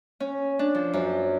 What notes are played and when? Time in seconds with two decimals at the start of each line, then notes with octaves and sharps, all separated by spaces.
0.20 C#4
0.59 D4
0.75 F3
0.93 F#2